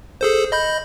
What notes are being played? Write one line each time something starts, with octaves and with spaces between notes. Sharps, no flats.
G#4 A4 C5
D#5 B5 G6